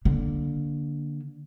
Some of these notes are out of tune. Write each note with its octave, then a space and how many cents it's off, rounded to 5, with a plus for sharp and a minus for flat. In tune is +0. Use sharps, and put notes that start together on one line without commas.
D3 +0 A#3 +20